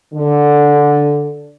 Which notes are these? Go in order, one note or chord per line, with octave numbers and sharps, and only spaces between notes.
D3